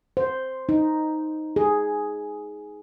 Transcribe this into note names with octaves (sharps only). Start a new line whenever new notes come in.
C5
D#4
G#4